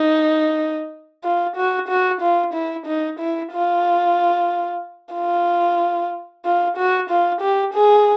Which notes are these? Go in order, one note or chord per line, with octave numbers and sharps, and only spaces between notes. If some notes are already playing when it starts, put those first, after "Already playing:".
Already playing: D#4
F4
F#4
F#4
F4
E4
D#4
E4
F4
F4
F4
F#4
F4
G4
G#4